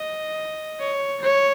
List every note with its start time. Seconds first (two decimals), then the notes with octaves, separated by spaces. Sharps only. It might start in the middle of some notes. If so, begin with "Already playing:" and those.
Already playing: D#5
0.79 C#5
1.22 C#5